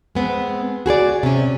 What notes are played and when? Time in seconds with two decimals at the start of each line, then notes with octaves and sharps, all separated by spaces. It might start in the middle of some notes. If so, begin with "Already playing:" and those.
0.15 G#3 B3 C4
0.86 F#4 G#4 B4 D5
1.23 C3 C#4